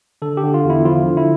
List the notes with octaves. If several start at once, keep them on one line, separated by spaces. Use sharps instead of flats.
D3 A4
G4
D3
F4
E2
E4
F3 F4
D3
E4